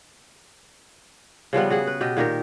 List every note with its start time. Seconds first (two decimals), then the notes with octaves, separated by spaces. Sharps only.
1.53 C#3 F3 G3 B3
1.70 F#4 G#4 F#5
1.87 B4
2.01 B2 G4 D#5
2.17 A#2 D#3 G4 A#4